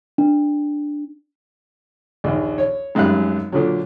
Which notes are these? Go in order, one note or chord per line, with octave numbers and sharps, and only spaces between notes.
D4
A#1 D#2
C#5
G#1 F#2 G3 F5 F#6
A#2 D3 F#3